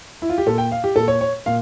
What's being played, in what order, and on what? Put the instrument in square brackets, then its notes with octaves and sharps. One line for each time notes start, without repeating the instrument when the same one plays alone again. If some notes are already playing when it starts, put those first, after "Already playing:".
[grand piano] E4
F4
G4
A#2 A4
G5
F5
G4
A#2 A4
C#5
C#5
A#2 F5